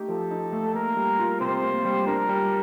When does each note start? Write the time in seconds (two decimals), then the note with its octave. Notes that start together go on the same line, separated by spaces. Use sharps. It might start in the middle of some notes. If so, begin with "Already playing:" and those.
Already playing: A3 D#4 G4
0.09 F3 A4
0.31 D#4
0.53 A3
0.74 A#3 A#4
0.97 G3
1.19 F4
1.41 C3 C5
1.63 A#3
1.85 G3
2.07 D4 A#4
2.29 G3